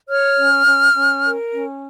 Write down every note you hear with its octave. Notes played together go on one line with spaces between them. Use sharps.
C#5 F6
C#4
C#4
C#4
A#4
C#4